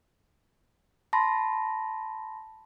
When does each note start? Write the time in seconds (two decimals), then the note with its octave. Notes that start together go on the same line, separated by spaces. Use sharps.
1.13 A5 B5 C6 A#6